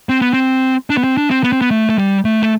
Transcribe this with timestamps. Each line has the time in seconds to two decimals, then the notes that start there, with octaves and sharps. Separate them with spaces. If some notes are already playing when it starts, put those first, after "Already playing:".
0.09 C4
0.22 B3
0.34 C4
0.90 D4
0.97 B3
1.04 C4
1.17 D4
1.31 C4
1.44 B3
1.52 C4
1.62 B3
1.71 A3
1.89 A3
1.98 G3
2.25 A3
2.43 A3